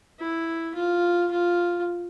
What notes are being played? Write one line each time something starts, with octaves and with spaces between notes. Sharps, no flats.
E4
F4
F4